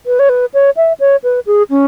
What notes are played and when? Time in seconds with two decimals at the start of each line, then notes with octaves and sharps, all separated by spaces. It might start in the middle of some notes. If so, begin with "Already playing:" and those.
0.06 B4
0.19 C#5
0.29 B4
0.54 C#5
0.77 E5
1.00 C#5
1.24 B4
1.46 G#4
1.70 C#4